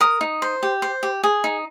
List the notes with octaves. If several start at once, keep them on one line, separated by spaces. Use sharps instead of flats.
A#4 D#6
D#4
C5
G4
C5
G4
G#4
D#4